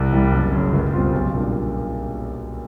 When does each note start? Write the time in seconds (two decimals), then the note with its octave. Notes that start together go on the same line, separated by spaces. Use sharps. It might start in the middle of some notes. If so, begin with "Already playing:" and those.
Already playing: C2
0.12 C3 E3 G3
0.32 F#1
0.52 F#2 C#3
0.72 C#2
0.93 B2 G3 C4 F4
1.13 B1
1.34 A#2 G3 A#3 D4